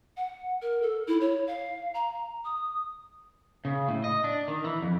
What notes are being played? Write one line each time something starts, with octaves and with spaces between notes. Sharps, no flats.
F#5
A#4
A4
E4
C#5
F5
A#5
D#6
C#3
A2
D#5
D4
D#3
E3
F2